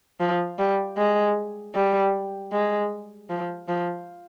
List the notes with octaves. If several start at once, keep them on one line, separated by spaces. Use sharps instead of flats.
F3
G3
G#3
G3
G#3
F3
F3